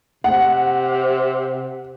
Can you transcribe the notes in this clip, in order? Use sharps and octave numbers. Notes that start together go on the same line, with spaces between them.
C3 F#5